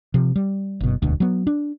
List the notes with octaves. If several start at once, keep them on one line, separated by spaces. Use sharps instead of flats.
C3 F3
G3
F#1 B2
E1 D2 B2
F#3 B3
D4